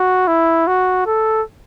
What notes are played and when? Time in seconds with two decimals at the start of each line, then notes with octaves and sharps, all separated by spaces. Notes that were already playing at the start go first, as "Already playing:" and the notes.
Already playing: F#4
0.28 E4
0.67 F#4
1.06 A4